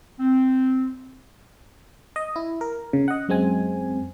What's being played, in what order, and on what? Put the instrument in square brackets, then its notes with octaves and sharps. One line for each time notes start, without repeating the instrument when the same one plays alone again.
[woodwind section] C4
[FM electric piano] D#5
E4
A#4
C#3
D#5 F#5
F#2 G#3 C4 G#5